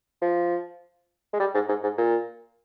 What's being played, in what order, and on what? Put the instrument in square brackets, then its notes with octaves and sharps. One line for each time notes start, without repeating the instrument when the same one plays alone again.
[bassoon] F3
G#3
G3
G#2
G#2
G#2
A#2